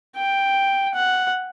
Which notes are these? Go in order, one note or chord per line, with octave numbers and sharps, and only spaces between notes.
G5
F#5